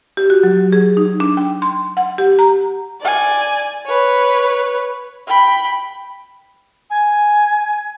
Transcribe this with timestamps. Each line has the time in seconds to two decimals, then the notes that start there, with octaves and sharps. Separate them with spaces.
0.17 G4
0.30 F#4
0.43 F#3
0.72 G#4
0.97 D#4
1.20 D4
1.37 G5
1.62 C6
1.97 F#5
2.18 G4
2.39 A#5
3.01 D5 G#5
3.86 B4 C#5
5.27 G5 B5
6.89 G#5